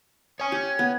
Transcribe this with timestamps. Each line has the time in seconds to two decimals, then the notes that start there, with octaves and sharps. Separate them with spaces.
0.40 C#5 G#5 D#6
0.52 G4 G#6
0.79 B3